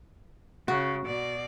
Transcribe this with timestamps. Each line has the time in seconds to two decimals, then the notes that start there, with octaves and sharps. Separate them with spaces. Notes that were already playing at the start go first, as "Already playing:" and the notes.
0.68 C#3 F#4
1.06 B2 D5